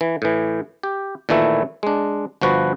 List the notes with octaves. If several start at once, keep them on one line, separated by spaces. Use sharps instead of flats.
E3
A2 E3
G4
A#2 D#3 E3 A3 E4
G#3 D4
G1 F3 F#4 B4